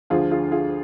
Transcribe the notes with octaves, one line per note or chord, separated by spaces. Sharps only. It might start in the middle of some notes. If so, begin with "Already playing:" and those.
D2 D3 F3 F4 G#4
F4 G#4
F4 G#4